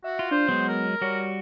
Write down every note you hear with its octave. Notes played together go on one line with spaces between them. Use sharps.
F#4 E5
F4
D4 C5
F#3 G#3 B3
A#4
G3 F#4 C#5